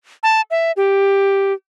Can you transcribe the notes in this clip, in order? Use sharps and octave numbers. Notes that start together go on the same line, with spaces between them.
A5
E5
G4